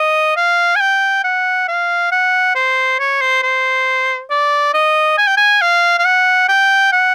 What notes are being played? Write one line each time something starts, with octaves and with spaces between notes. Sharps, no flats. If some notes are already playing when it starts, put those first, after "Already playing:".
Already playing: D#5
F5
G#5
G5
F#5
F5
F#5
C5
C#5
C5
C5
D5
D#5
G#5
G5
G#5
F5
F5
F#5
G5
F#5